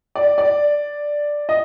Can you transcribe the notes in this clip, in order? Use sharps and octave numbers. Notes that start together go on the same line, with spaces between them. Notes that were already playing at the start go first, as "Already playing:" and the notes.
D5
D5
D#5